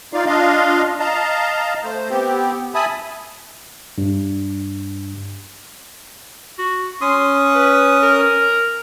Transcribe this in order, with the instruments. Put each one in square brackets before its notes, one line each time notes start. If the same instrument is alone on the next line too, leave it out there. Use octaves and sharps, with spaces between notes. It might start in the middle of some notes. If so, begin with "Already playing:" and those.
[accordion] D#4 F4 D5 F5
D4 F4 D#5 F5
D#5 F5 A5 A#5
A3 C5
B3 C4 G4
E5 G#5 A5 B5 D#6
[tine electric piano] G2
[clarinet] F#4
[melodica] C#4 D#6 [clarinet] C6
[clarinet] B4
A#4